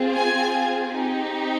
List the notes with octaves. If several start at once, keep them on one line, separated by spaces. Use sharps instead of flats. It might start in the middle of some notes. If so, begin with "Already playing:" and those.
Already playing: C4 F4 G#4
G#5
C4 D#4 G4